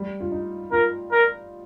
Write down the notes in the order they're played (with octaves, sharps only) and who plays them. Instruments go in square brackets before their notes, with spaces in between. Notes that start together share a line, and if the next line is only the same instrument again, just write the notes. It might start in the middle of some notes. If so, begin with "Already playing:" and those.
Already playing: [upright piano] G3
F4
D#4
[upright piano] F4 [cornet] A#4
[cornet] A#4